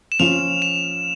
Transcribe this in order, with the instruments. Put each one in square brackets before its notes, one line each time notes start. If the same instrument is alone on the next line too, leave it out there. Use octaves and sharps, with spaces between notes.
[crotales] E7
[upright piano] F3 C#4 F4 [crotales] F7
[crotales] E7